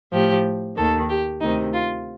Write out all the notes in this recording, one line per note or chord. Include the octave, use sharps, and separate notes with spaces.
A2 F3 G4
D#2 D#3 A4
G4
D2 C3 D#3 D#4
F4